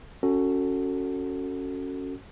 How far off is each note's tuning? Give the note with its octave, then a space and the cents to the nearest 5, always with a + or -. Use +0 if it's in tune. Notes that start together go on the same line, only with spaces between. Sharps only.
C#4 +0 F#4 +0 A4 +25